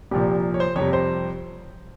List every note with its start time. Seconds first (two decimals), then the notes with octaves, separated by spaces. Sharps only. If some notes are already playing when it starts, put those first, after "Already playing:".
0.11 C2 A#2 F3 G4
0.54 C#5
0.60 C5
0.76 F2 C3 G3 C#5
0.93 C5